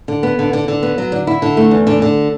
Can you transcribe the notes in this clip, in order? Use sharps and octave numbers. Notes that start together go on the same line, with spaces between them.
D3
B3
D3
D3
D3
B3
F#3
D3
E4
D3
A3
E2
D3
D3